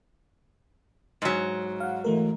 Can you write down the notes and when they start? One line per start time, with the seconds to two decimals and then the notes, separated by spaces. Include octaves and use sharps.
1.22 G#2 F#3
1.80 F5 F#5
2.04 E3 A3 A#4